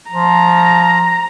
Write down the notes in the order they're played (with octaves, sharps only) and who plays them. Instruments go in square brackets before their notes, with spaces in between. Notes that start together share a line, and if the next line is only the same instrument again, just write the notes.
[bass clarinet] F3 [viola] A#5